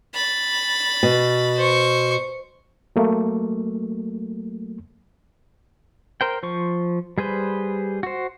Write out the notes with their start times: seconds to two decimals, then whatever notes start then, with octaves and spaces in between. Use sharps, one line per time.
0.14 B5 A6
1.03 B2
1.58 C5 C#6
2.96 F#3 A3 A#3
6.21 A#4 C5 G5
6.43 F3 C5 C#6
7.18 G3 G#4 B4 C5
8.03 F#4 C5